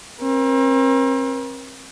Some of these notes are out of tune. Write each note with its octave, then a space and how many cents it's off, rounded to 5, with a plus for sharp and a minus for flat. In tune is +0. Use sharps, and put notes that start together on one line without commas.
C4 +40 A#4 +40